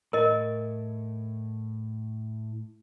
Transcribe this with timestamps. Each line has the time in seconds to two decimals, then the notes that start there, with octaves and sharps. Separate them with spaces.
0.13 A2 A#4 D#5